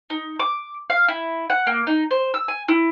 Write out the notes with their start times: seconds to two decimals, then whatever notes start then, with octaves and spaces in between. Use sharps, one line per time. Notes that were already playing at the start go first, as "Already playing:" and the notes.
0.10 D#4
0.39 D6
0.90 F5
1.08 E4
1.50 F#5
1.67 A#3
1.87 D#4
2.11 C5
2.34 E6
2.48 G#5
2.68 E4